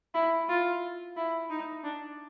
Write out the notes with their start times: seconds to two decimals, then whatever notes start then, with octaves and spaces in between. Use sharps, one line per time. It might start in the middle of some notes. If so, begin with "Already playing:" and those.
0.14 E4
0.48 F4
1.17 E4
1.50 D#4
1.84 D4